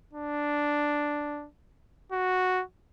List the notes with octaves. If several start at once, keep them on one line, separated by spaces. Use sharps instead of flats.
D4
F#4